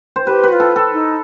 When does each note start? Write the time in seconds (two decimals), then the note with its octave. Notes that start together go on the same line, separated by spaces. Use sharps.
0.16 C5
0.26 G4 B4
0.44 F#4 B4
0.53 F4
0.60 A4
0.76 A4
0.92 D#4